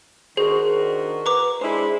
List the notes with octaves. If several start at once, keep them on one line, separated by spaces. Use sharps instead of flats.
D#3 D4 F#4 G#4 A#4 C5
B4 A#5 D6
G#3 D4 E4 G#4 C5